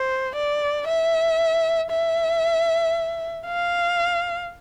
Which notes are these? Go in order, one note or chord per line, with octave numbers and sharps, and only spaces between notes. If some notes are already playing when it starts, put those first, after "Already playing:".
Already playing: C5
D5
E5
E5
F5